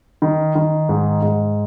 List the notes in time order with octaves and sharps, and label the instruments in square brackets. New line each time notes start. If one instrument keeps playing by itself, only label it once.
[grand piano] D#3
D#3
G#2
G#2